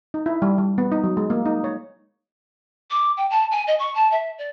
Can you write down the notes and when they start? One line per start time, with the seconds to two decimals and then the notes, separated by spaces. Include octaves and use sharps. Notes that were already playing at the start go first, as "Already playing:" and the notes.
0.14 D#4
0.26 E4
0.42 G3
0.58 G3
0.78 B3
0.92 D#4
1.04 F#3
1.17 G#3
1.30 A#3
1.46 D#4
1.64 C#5
2.90 D6
3.17 G5
3.30 A5
3.51 G#5
3.67 D#5
3.79 C#6
3.94 A5
4.11 E5
4.38 D5